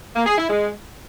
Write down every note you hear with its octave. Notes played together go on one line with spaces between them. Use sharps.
A#3
G#4
E4
G#3